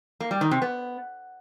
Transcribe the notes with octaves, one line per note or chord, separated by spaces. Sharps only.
A#3
G3
D#3
C3
B3